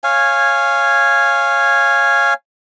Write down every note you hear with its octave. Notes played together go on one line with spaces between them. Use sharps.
C#5 F5 G#5